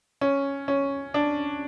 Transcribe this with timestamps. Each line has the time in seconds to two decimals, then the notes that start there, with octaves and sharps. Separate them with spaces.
0.21 C#4
0.68 C#4
1.14 D4